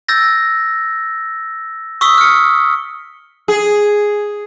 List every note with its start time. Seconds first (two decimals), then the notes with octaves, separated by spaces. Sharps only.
0.09 E6 G6 A6 A#6
2.01 C#6 D#6 E6 B6 G7
2.18 F6 C#7
3.48 G#4